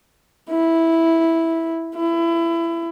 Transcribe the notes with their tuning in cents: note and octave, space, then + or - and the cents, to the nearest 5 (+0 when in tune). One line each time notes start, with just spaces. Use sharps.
E4 -5
E4 +25